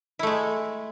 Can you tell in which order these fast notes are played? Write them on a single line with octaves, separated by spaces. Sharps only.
E4 A3 G#3